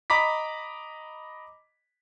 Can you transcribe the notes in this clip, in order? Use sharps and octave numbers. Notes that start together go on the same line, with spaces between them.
D#5 A#5 B5 D6 B6